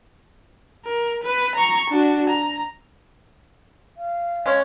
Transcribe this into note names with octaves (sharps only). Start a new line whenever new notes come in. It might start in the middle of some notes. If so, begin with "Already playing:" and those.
A#4
B4
A#5 C#6
D4 F#4
A#5
F5
G#3 C#4